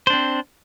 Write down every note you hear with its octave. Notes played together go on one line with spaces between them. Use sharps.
C4 D4 C5